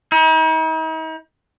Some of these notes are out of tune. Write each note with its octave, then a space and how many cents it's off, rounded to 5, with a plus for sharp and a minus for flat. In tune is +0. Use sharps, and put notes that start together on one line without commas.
D#4 +45